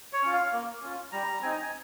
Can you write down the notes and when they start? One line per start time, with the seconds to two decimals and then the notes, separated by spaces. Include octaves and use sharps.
0.13 C#5
0.23 C#4 F4
0.33 F5
0.52 A#3
0.82 C#4 F4
1.12 G3 A#5
1.42 C4 D#4 G#5
1.52 A#5
1.62 G#5